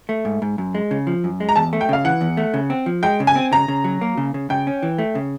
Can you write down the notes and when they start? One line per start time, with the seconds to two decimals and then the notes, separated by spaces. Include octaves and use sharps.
0.09 A3
0.25 G#2
0.42 G#2
0.58 F#2
0.75 G#3
0.91 C#3
1.07 F3
1.24 F#2
1.40 G#3
1.49 A#5
1.56 E2 A5
1.73 A3
1.81 G5
1.89 C#3 F5
2.05 E3 F#5
2.21 E2
2.37 A3
2.54 C#3
2.70 C4
2.86 F3
3.03 G#3 G5
3.20 C#3
3.27 G#5
3.36 C4
3.52 C#3 A#5
3.68 C#3
3.84 F#3
4.01 A#3
4.17 C#3
4.34 C#3
4.50 C#3 G5
4.67 C#4
4.83 E3
4.98 A3
5.15 C#3